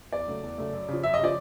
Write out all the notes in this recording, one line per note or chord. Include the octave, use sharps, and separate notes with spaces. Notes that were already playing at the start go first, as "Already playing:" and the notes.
E2 D5
C#3 F#3 A3
E2
C#3 F#3 A3
F#2
C#3 F3
F#2 E5
D#5
C#3 F3 D5